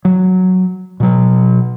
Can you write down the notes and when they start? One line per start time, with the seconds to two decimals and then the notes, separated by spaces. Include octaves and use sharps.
0.05 F#3
1.00 B2 F#3